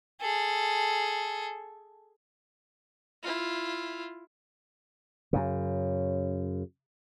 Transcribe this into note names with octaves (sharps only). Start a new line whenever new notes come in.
G#4 A4
E4 F4
F#2 C#3